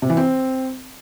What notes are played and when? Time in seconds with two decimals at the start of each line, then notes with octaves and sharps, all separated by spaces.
0.02 C3
0.10 E3
0.17 C4